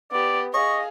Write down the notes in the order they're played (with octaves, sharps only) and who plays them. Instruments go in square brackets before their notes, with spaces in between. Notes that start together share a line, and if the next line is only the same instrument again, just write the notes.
[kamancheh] B3 G4 [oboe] D5
[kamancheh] G#4 F5 [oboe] D#5 [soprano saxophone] C#6